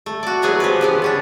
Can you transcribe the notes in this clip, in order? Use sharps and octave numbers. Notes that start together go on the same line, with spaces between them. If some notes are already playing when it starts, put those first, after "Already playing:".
A3
F#4 D5
A#2 E3 F#3 B3 G#4
F3 G4 B4
C#3 E3 B3
B3 C#4 D4